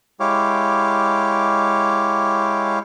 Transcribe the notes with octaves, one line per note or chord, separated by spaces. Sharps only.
G#3 E4 G4 C#5 F5 D6